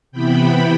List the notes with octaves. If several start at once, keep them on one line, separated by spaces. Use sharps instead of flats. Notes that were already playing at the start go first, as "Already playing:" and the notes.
C3 E3 B3 E4 G5 B5